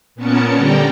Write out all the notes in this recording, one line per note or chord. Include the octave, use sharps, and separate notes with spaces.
A#2 B3 C#4 A#4 A5 C#7
D3 G3 D5 G5 A#5